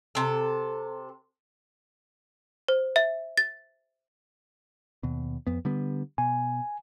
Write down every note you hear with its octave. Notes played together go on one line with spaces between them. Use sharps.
C3 A4
C5
E5
A6
D#2 B2
F2 B3
D3 G3 B3
B2 G#5